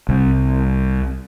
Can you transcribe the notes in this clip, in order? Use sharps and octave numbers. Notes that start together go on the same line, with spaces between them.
C2